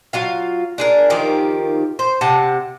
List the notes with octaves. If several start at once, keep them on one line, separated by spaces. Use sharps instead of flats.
F#3 F4 F5
D4 G#4 A#4
D#3 F3 G4 A#4
C5
C3 F#5 A5